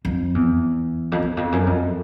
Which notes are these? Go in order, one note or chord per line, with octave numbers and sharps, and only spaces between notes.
F2
E2
F2
E2
F2
F#2
F2